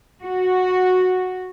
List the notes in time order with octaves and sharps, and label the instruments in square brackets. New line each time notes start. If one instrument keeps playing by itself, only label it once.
[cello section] F#4